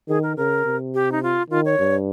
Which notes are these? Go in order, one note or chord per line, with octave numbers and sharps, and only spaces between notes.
D#3 G#4
A#4
C#3 A#4
C3
G4
D#4
F4
D#3 F4
C#5
G2